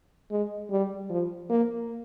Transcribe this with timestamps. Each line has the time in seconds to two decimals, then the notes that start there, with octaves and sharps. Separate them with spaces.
0.31 G#3
0.70 G3
1.10 F3
1.50 A#3